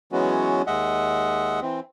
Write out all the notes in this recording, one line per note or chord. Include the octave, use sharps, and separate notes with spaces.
E3 F#3 G#3 B3 C#4 F#4
D#2 G#3 D#5 E5 F#5
E3 C4